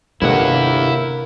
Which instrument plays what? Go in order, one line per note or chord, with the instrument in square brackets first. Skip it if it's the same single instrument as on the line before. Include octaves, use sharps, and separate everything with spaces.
[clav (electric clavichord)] G1 D#2 C#5 [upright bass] C3 [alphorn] A#3 [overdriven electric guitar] E4 F#5